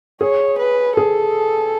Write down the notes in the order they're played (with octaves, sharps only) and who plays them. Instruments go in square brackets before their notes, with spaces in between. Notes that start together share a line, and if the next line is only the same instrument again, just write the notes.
[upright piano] G#4 [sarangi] C#5
[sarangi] B4
[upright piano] G#4 [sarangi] A4